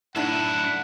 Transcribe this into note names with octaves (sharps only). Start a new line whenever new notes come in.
F#2 A2 D4 E4 F#5